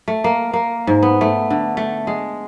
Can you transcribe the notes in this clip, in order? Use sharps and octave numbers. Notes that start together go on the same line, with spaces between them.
A3
A#3
A#3
G#2
B3
A3
D3
A3
G#3